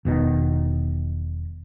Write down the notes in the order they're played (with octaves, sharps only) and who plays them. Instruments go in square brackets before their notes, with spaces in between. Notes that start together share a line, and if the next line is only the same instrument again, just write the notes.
[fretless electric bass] E1 B2 D#3